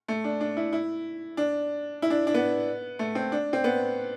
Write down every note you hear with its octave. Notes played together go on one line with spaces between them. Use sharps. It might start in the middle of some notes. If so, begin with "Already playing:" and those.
A3
D4
D4
E4
E4
D4
E4
D4
D4
B3
A3
C4
D4
C4
B3